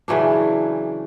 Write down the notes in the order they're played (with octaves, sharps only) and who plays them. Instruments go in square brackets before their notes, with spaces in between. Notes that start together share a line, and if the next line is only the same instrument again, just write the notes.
[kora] C#3 E3 F#3 D4